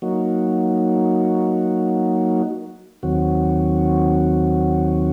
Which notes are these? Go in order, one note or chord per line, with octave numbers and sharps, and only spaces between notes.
F#3 A#3 D#4 F#4
D#2 D#3 F#3 C4 F#4